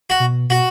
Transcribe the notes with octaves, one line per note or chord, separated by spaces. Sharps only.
F#4
B2
B2 F#4